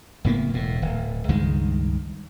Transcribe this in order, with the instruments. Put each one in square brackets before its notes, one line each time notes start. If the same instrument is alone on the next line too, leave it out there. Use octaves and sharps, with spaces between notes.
[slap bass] F#1 A2 A#3 B3
E1 A2
D1
C#2 G2 D#3 G#3